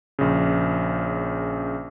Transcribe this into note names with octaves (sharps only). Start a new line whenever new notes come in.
A#1 C#3